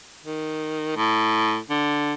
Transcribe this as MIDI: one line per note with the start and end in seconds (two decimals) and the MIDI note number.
0.24 0.93 51
0.96 1.58 45
1.70 2.13 50